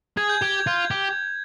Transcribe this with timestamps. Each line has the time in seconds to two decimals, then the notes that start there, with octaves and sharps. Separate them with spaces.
0.17 G#4 G#6
0.29 G6
0.42 G4 G#6
0.67 F4
0.91 G4